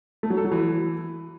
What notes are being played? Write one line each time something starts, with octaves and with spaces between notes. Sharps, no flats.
A3
F#3
A4
F#3
E3